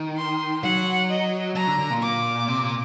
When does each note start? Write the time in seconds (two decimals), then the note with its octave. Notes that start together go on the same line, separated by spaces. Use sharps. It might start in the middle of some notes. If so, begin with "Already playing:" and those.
Already playing: D#3
0.17 C6
0.63 F#3 F#5
1.10 D#5
1.55 F#3 A#5
1.67 D3
1.79 D3
1.90 A#2
2.03 D6
2.48 C3
2.63 A#2